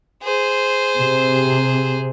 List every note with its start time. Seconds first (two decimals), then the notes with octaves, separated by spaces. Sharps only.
0.23 G#4 C5
0.98 C3